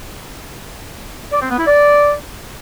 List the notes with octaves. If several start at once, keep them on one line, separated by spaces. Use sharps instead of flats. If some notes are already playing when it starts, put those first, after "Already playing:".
D5
C4
B3
E4
D5